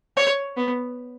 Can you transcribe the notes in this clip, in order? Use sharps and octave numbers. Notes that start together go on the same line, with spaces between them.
C#5
B3